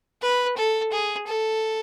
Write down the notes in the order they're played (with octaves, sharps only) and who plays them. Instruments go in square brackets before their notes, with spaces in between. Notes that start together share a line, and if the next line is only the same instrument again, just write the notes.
[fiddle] B4
A4
G#4
A4